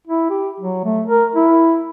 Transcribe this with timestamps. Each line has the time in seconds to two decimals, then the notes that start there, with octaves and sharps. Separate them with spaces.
0.08 E4
0.30 G4
0.60 F#3
0.85 A3
1.07 A#4
1.36 E4